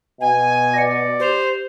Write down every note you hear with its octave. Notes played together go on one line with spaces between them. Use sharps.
B2 G#5
D5 A#6 C#7
G4 C5 F7